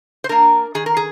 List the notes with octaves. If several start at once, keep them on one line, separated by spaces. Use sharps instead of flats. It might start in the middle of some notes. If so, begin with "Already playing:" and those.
C5
A#3 D4 A#4
D#3 G#4
A#4
G#4